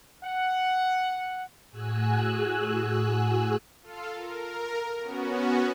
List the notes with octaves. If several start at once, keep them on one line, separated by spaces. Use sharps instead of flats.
F#5
A2 F#4 G#4 G#5 E6 F#6
F4 A4 F5
A#4
B3 C#4 F#4